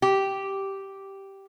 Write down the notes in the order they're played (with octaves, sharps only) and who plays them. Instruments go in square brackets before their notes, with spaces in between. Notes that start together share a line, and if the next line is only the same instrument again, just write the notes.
[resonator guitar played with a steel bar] G4